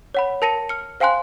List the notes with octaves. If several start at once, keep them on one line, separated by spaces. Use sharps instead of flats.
C#5 F#5 B5
A#4 A5 A#6 C#7 D#7
F6 C#7
C5 F5 G5 G#5 C6 F#6